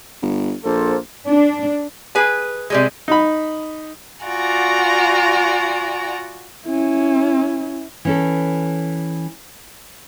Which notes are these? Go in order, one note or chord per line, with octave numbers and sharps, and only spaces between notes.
G1
A#1 A#3 A4 C5
D4
G#4 B4 G#5
C3 G3 G#3
D#4 B5
F4 F#4 D5 F#5 G#5 A#5
C#4 E4
E3 C#4 A4